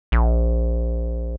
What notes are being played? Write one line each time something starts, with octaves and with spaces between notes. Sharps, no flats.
A#1